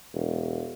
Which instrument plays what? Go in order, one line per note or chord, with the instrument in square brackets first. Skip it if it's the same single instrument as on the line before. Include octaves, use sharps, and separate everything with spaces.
[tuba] E1